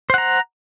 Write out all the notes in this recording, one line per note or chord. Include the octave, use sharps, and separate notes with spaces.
C5 F#5 A#5